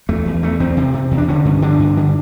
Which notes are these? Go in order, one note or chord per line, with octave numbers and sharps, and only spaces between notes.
E2 A3
E2
E2 A3
E2 C4
C3
C3
E2
D4
D3 C#4
G2
D3 D4
G2
D3